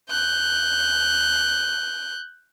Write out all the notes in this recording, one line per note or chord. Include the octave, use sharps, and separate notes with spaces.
F#6 G6